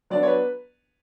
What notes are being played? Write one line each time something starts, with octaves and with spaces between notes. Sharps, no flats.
F#3 B3 D4 D5
C#5
B4